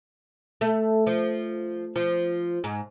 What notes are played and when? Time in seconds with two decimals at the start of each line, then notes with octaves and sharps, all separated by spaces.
0.61 A3
1.07 F3
1.96 F3
2.64 G#2